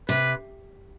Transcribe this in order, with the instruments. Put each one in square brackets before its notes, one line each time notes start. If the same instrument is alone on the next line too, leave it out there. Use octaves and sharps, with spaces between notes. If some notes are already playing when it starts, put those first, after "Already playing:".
[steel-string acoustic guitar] C3 [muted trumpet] B4